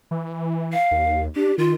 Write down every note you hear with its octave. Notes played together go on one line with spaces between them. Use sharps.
E3
F5
D#2
D4 G4
D#3 F4